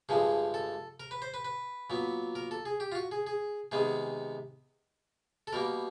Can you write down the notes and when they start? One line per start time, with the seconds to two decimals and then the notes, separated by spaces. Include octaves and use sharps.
0.09 G2 D3 F3 G#3 G#4
0.54 A4
1.00 A#4
1.11 B4
1.22 C5
1.34 B4
1.45 B4
1.90 A#2 F#3 B3
2.35 A#4
2.51 A4
2.65 G#4
2.80 G4
2.92 F4
2.95 F#4
3.11 G#4
3.27 G#4
3.72 C3 D#3 G#3 B3 G#4
5.47 A4
5.53 B2 G3 A#3 A#4